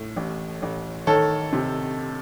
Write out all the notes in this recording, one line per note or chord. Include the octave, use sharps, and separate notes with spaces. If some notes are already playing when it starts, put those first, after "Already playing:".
Already playing: A2
A1
A1
D#3 A4 C#5
C3